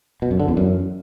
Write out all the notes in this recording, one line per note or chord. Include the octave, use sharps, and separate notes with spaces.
B2
F#2
D3
E2
F#2